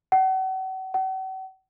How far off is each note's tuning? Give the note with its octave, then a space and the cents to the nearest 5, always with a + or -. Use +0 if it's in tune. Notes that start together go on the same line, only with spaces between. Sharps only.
F#5 +40
F#5 +45